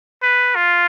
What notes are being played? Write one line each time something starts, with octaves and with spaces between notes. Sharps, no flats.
B4
F4